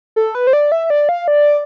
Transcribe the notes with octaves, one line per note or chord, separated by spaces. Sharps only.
A4
B4
C5
D5
E5
D5
F5
D5